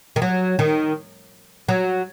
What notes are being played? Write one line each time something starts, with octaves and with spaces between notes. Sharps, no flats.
D#3
F#3
D#3
F#3